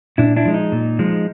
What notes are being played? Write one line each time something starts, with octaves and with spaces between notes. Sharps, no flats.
A#2 D4 E4
D4 E4
F3 G#3
D#4
A#2
F3 G#3